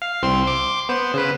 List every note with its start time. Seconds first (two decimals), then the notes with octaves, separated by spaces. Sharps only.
0.02 F5
0.23 C2 C4 C6
0.43 C6 D6
0.89 B3 C5
1.14 C#3 B4